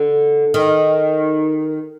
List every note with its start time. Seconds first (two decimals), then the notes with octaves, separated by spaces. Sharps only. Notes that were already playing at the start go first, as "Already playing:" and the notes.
Already playing: D3
0.54 D#3